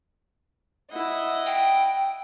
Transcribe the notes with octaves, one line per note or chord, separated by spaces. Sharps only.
E4 D#5 F#5
G5